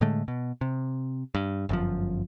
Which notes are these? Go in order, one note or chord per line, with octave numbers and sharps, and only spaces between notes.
A2 D3 G#3 A3
B2
C3
G2
G1 F#2 F3